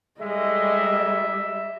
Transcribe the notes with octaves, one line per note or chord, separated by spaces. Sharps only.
A2 G3 G#3 D#5 E5